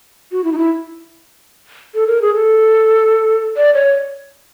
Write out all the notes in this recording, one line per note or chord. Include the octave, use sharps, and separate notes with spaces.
F#4
E4
D#4
E4
A4
A#4
G#4
A4
D5
C#5